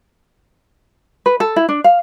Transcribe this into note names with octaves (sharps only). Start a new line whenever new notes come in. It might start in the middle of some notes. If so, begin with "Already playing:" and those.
B4
A4
E4
D4
F5